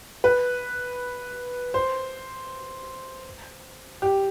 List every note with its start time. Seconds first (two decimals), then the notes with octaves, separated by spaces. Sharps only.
0.24 B4
1.74 C5
4.02 G4